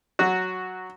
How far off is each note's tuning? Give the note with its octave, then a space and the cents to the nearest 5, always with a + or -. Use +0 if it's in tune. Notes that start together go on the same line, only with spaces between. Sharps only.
F#3 +0 F#4 +0